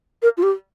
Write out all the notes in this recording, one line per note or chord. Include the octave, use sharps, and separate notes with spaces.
A#4
F4
G4